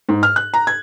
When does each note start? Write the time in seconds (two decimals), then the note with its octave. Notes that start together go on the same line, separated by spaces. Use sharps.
0.09 G#2
0.23 F6
0.36 F#6
0.54 A#5
0.67 G#6